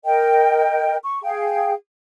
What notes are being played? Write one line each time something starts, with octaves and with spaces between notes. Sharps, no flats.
A#4 D#5 G5
C#6
G#4 F5 G5